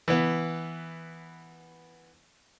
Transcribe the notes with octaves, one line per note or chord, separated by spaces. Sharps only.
E3 B3